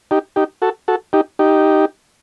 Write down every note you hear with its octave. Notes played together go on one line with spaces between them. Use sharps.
D#4 G4
D#4 G4
F#4 A4
F#4 A4
D#4 G4
D#4 G4